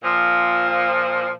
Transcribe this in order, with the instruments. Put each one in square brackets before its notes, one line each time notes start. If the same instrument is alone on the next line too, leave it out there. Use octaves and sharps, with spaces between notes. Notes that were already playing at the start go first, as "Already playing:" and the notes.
[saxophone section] A#2 F3